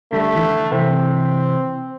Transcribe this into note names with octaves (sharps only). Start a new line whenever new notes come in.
D3 G3 A3
E3
D3
C3 E3 C4